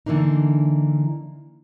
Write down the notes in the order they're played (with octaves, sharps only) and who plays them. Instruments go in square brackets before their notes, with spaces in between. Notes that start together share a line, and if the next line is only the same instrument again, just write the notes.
[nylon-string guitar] D3 E3 A#3 D4 D#4